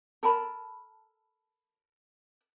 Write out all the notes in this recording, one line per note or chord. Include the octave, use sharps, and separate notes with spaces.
A4 A#4 A5 B5